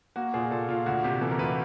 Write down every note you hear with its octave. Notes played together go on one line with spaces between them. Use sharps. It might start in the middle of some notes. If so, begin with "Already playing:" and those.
A#3 F#4
A#2 G#4
A#2 A4
A#2 F4
D2 F#4
C3 G4
E3 A4
A#4
D2 B4